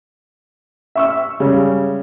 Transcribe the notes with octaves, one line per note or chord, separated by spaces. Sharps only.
E5 C#6 E6
C#3 G3 G#3